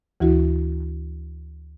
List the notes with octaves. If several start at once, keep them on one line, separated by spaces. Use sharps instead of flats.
D2 E3 E4 F#4